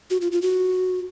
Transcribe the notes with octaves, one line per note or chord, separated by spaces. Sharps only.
F#4
F4
F4
F#4